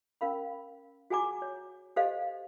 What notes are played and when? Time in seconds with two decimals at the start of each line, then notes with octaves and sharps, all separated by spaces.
0.21 C#4 A#4 F5 B5
1.10 F#4 G#4 F#5 G#5 A#5 D6
1.42 C#5
1.96 G4 A4 C5 D#5 F5